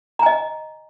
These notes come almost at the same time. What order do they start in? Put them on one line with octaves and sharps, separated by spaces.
A#5 G#5 D#5